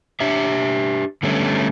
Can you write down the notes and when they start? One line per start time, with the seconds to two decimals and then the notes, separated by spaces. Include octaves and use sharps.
0.20 D4 G4 E5
1.23 D3 G3 A3 B3 C#4